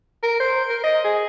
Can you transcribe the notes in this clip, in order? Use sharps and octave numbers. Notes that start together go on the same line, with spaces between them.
A#4
C5
A#4
D#5
G#4